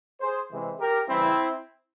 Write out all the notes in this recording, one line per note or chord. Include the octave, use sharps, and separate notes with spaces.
G#4 C5
C3 E3 G#3 C4
G4 A#4
C#3 E3 G3 C4 E4